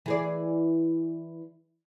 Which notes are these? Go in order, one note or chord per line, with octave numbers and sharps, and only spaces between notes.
E3 G#4 D5